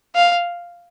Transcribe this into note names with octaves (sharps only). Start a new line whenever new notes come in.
F5